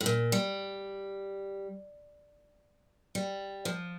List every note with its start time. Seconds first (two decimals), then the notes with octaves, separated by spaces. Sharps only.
0.01 A2
0.06 A#2
0.32 G3
3.15 G3
3.65 F3